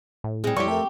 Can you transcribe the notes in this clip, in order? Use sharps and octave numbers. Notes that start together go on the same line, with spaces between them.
A2
G3 G#3 C4 G#4
F2 G3 E4 G4 C#5 D5 G5 C#6
A3 A#4 E5